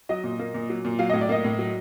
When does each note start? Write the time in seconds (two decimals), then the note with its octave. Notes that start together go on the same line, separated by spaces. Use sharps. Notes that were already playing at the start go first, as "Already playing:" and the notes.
0.09 F#3 D#5
0.24 A#2
0.39 A#3
0.54 A#2
0.69 F#3
0.85 A#2
0.99 F#3 F5
1.10 D#5
1.13 A2
1.21 D5
1.29 A#3 D#5
1.44 A2
1.59 F#3